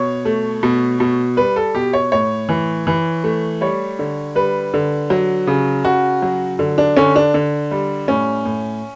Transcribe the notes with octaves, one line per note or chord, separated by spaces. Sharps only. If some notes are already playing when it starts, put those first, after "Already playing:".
Already playing: B2 C#5
A3
B2
B2
G3 B4
A4
B2 G4
C#5
A2 C#5
E3
E3
A3
G3 C#5
D3
G3 B4
D3
F#3
C#3
C#3 F#4
F#3
D3
D4
D3 C#4
D4
D3
G3
A2 C#4
A2